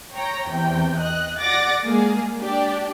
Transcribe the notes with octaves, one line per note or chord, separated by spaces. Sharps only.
C#5 G5 A#5
E2 C3 G5
D#5 F#6
D5 F#5 D6 A6 A#6
G#3 A#3 G#4
D4 G4 D5